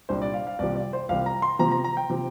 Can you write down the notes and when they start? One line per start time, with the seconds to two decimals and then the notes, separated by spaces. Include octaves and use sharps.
0.09 C2 A#2 G3 D4 C5
0.22 D5
0.34 F5
0.47 F5
0.59 C2 C3 F3 D5
0.76 D5
0.93 C5
1.09 C2 C3 F3 F5
1.26 A#5
1.42 C6
1.59 C3 F3 C4 A#5
1.72 A#5
1.84 A#5
1.97 G5
2.09 C3 F3 C4